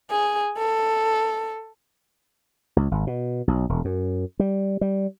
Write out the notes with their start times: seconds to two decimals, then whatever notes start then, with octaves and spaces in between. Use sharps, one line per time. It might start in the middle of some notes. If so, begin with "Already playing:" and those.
0.11 G#4
0.57 A4
2.76 C#2
2.91 G#1
3.07 B2
3.48 B1
3.69 E1
3.85 F#2
4.40 G3
4.81 G3